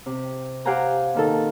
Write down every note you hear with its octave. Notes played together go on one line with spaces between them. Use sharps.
C3
G4 C5 F5 F#5 G#5 A#5
A#2 D#3 A4